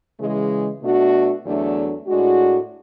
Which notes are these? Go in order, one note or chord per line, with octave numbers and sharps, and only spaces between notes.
C#3 E3 G#3
B2 A3 D4 F#4
E2 D3 F#3 A3 D4
A2 G#3 D4 F#4